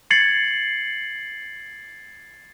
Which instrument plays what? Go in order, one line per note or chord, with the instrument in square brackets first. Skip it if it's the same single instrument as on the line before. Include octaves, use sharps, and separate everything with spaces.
[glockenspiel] G#6 A6 C7 C#7 F#7